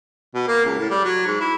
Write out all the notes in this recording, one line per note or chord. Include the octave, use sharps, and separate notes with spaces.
B2
A#3
C#2
A2
G3
F#3
G#2
E4